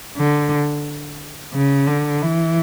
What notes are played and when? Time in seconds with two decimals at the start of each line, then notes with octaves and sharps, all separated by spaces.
0.17 D3
1.54 C#3
1.87 D3
2.22 E3